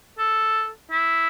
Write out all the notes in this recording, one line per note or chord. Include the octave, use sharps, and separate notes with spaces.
A4
E4